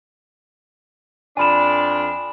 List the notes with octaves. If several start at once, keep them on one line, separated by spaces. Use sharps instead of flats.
F2 D4 G#5 B5 E7